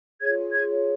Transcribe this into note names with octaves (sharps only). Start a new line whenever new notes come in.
F4 G#4 C#5 G#6
G#6